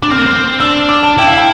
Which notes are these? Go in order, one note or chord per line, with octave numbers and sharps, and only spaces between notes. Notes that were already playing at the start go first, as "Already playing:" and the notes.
D4 D6
C4 F6
A#3
C4 F6
D4 E6
D6
A5
E4 G5
F5
G5